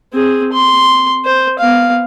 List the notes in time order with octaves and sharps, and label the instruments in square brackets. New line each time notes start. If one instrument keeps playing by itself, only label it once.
[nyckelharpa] C4 G#4
C6
C5
B3 F5